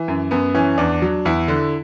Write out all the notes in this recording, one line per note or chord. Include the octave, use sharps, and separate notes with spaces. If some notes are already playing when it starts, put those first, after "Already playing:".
Already playing: E3
F#2
F#2 B3
E3 C#4
E2 D4
F#3
E2 E4
D3